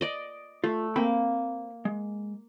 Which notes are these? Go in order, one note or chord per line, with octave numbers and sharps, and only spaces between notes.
D5 D#5
A3 F4
A#3 C4 G5 B5
G#3